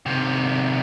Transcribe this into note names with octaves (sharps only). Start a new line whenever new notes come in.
C3 D#3